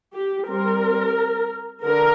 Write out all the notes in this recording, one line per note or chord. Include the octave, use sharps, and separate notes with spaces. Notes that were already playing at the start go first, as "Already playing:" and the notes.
G4
G3 C4 A#4
D3 A#4